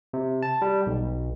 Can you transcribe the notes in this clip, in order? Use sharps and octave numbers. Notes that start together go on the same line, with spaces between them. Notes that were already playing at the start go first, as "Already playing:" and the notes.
C3
A5
G3
B1